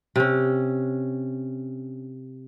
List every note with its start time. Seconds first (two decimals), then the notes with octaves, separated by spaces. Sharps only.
0.16 C3 C#4